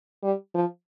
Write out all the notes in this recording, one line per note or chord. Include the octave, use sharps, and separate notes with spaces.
G3
F3